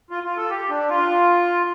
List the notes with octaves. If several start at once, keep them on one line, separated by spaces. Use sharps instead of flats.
F4
F4
A4
G4
D4
F4